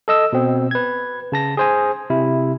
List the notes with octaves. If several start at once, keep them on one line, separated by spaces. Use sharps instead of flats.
A4 D#5 E6
B2 C4
B4 G#6
C#3 A5 A#6
G#4 C5 G#5
C3 E4